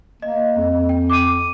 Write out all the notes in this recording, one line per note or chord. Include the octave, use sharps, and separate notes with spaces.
A#3 D#5
F2
G5
D6 D#7